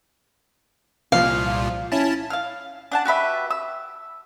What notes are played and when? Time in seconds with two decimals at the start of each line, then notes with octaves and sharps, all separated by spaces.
1.12 C2 A#2 F3 F5
1.92 C#4 E4 A5
2.30 F5 F6
2.92 D4 F#5 A5
3.05 F#4 G4 B4 E5
3.51 E6